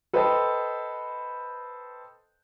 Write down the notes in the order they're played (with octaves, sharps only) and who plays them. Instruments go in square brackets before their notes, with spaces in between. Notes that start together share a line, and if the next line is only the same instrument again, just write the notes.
[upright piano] A4 B4 C5 D#5 G5